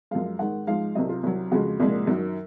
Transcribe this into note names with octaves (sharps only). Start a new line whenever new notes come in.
F#2 F3 G#3 F5
G#2 D#3 G#3 F#5
G#2 F3 G#3 F5
C2 C3 F#3 D#5
F4
C2 C3 F#3
F2 C#3 F3 G#3 F#4
C2 A#2 F3 G#3
F#2 D#3 F#3